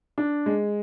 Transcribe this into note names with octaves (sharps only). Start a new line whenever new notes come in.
D4
G#3